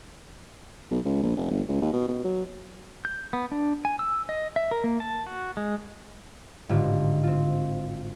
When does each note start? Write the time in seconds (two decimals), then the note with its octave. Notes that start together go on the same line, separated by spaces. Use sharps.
0.91 B1
1.05 C#2
1.23 A#1
1.36 F1
1.51 G1
1.69 C#2
1.82 D#2
1.93 B2
2.08 B2
2.25 F#3
3.05 G6
3.33 B3
3.52 D4
3.85 G#5
3.99 E6
4.29 D#5
4.56 E5
4.71 A#4
4.84 A#3
5.00 A5
5.27 F#4
5.57 G#3
6.69 G#1 A2 D3 F4 G4
7.23 C4 F4